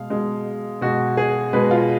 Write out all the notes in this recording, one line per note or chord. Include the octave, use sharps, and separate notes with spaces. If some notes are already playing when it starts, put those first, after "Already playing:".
Already playing: B2 G#3 F5
B2 G#3
B2 G#3 F#4
G#4
B2 G#3 B4
F4